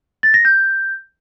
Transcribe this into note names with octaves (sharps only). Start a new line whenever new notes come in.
A6
A#6
G6